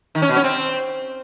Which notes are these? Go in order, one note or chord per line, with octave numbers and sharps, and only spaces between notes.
D#3
C#4
B2
C#4
C4